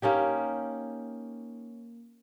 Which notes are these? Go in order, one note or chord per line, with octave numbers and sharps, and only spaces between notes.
A#3 C#4 D#4 G4